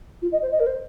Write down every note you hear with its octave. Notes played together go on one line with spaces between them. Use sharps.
F4
D#5
C5
D#5
A#4
C5